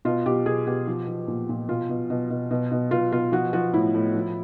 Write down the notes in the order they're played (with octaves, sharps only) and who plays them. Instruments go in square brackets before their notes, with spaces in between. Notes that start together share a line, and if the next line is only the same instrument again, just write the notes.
[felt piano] B2 F4
B2 G4
B2 G#4
B2 G4
F3
F3
A#2
A#2
B2 F4
B2
B2
B2
B2
B2
B2 F4
B2 F4
F3 F#4
F3 F#4
A2 E4
A2
F3